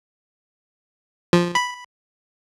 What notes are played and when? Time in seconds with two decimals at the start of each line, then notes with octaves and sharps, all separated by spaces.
1.33 F3
1.55 B5